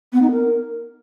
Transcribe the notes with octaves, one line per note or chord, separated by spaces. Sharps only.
B3
D#4
A#4